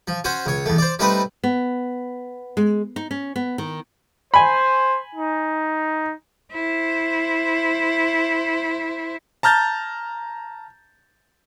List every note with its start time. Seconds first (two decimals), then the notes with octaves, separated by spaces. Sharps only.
0.08 F3
0.24 C#4 F#4 C5
0.46 C#2 C#5
0.66 E2 A3
0.78 C5 D5
0.99 G3 A3 C4 D#4 B4
1.44 B3
2.57 G#3
2.96 D#4
3.11 C#4
3.36 B3
3.58 D#3
4.34 C5 G#5 B5
5.15 D#4
6.52 E4 C5
9.43 A5 A#5 F6 G6 A6